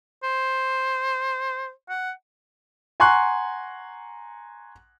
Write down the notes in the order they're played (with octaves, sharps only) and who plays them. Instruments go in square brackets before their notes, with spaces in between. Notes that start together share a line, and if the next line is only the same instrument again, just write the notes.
[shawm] C5
F#5
[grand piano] F#5 G#5 A#5 C6 C#6 F#6